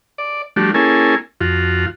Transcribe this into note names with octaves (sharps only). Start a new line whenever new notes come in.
D5
F3 G3 A3 D4 F#4
A#3 C#4 E4 G#4 A4 G#5
F2 F4 F#4